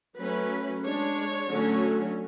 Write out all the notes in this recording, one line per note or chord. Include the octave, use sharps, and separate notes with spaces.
F#3 A3 C#4 B4
G#3 D4 C#5
D3 F#3 A3 C#4